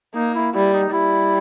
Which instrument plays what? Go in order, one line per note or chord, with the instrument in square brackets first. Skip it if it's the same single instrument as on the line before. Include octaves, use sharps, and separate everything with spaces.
[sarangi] A#3 [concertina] D#4
[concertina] E4
[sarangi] G3 [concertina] E4
[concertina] D#4
[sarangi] G3 [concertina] E4